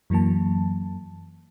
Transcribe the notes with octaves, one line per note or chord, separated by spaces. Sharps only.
F#2 E3 F#3 A#3 A5